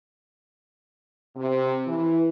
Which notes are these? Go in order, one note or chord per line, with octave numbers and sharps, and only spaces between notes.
C3
E3